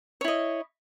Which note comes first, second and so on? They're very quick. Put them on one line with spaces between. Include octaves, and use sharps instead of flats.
C#5 E4 D#5